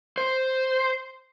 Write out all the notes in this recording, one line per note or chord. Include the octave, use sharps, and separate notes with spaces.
C5